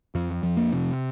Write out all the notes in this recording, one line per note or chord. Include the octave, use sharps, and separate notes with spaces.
F2 F3
F2
A#3
C3